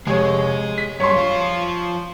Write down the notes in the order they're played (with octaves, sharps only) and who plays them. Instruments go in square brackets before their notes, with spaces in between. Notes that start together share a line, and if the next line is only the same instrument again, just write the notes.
[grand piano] F1 C#5 [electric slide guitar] G#3 G#4
[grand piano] B6
[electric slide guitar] F#2 G3 [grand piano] C#5 C6
[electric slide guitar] F3 F4